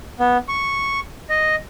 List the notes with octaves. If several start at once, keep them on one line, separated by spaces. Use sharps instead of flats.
B3
C#6
D#5